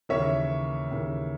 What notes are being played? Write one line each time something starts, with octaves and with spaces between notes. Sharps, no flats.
D#2 C#3 E3 C#5 E5
D#2 C#3 E3